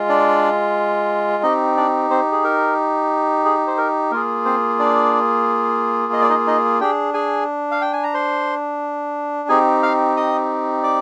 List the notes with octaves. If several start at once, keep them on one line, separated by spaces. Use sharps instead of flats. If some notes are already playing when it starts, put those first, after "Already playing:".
Already playing: G#3 F4
D4 D5
C4 D#4 G4 D#5
D4 D5
C4 C5
G#4
A#4
G#4
C5
A#4
A#3 F4 G#4 A#4
C4 C5
D4 D5
D#5
D5
D#4 D#5
D#4 D#5
D4 G4 G#4 G5
G#4 G#5
F5
G5
G#5
A#5
C5 C6
C4 D#4 G4 G#4 G#5
F5 F6
D#5 D#6
D5 D6